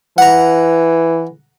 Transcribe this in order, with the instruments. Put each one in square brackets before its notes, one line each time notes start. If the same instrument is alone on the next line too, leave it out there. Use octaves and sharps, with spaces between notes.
[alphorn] E3 [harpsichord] F#5 A#5